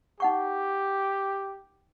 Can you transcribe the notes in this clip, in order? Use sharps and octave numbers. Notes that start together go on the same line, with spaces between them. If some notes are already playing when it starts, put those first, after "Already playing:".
D#4 G4 F#5 C#6